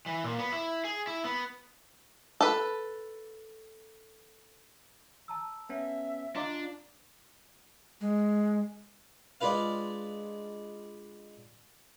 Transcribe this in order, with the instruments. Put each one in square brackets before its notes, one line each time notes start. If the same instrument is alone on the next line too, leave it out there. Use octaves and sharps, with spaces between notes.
[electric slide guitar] E3
A#2
B3
E4
G#4
E4
B3
[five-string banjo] A4 B4
[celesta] A5 A#5 E6
[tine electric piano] B3 C#4 [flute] E5
[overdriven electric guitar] D4 [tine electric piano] F4 [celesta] D#5 A#5 D6
[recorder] G#3
[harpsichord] G#3 D4 F4 B4 F5